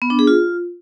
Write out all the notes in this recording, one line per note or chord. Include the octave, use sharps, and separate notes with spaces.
B3
D4
G#4
F4